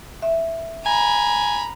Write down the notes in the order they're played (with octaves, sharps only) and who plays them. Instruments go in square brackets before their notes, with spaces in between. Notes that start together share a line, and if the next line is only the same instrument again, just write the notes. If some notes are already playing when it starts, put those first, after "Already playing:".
[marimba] E5
[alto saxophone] G#5 [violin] A#5 B5